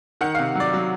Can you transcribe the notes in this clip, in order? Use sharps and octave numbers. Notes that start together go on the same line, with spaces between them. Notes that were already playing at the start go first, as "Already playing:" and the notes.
D#3 F#5
F5
C3
F#3 D5
F#3